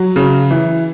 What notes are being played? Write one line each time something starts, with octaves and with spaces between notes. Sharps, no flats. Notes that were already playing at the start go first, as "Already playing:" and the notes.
Already playing: F#3
C#3
E3